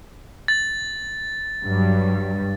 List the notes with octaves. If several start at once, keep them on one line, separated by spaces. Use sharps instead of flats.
A6
G2 F#3 G3